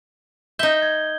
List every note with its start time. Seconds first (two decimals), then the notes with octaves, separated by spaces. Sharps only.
0.59 D#4 E5 G6 G7
0.82 G#6